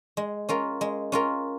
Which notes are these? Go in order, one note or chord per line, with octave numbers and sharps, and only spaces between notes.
G#3
C#4 F4 A#4
G#3
C#4 F4 A#4